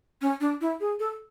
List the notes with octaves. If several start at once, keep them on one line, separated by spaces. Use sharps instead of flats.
C#4
D4
E4
G#4
A4